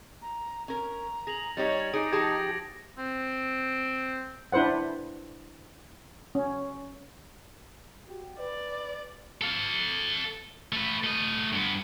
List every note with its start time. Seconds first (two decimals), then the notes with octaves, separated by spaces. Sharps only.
0.22 A#5
0.68 C#4 A#4 A#5
1.27 G#4 A#6 F7 F#7
1.57 G3 D#4 G4 C#5 A6
1.93 D#4 G#4 D6 C#7 D7
2.12 F3 G4 G#4 A5 G#6 A#6 C#7
2.98 C4
4.52 D4 E4 B4 C5 F#5
6.35 C#4
8.08 F#4 G4
8.38 B4 D5
9.41 A4 F5
10.73 A3 B4
11.04 A3 D#5
11.53 G2 B3